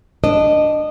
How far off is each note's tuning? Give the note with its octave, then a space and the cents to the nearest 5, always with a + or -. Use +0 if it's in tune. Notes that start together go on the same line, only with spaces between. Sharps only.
D4 +0 D#5 -20